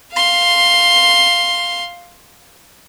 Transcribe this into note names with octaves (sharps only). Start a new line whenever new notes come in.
F5 C6